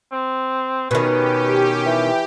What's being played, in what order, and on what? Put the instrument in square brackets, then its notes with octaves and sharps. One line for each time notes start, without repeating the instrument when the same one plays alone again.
[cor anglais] C4
[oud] B2 D#3 [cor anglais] C#4 [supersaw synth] G4 [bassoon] B4
[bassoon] E3